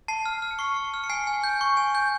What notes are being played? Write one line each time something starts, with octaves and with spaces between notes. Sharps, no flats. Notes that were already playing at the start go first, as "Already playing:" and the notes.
A5 C7
F6
F6
C#7
C#6 C7
C#6
F6
C#7
G#5 C7
G#5
G6
C#6
G#5
G6